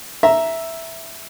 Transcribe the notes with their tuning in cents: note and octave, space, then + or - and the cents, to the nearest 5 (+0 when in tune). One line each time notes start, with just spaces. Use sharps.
E5 +0 A#5 +0